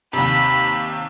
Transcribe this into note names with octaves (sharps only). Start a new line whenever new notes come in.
D#2 C3 B5